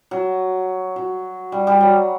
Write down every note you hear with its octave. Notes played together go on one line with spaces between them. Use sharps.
F#3
F#3
G3
G3
F#3